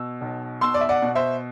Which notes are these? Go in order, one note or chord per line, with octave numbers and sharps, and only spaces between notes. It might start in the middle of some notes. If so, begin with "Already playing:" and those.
Already playing: B2 E6
B1
B2 C6 E6
D5
E5
D5 F#5
B2
C5 E5